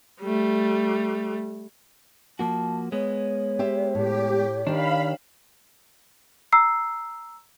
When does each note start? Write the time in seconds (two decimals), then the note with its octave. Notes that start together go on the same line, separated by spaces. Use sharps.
0.21 G3 A3
2.39 F3 A#3 F#4 A5
2.92 G#3 B3 C#5
3.59 G4 C5 E5
3.95 A2 G4
4.67 D#3 D4 G4 F5 B5
6.53 A#5 E6 C7